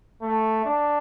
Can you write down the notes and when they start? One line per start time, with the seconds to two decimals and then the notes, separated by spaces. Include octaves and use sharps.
0.22 A3
0.65 D4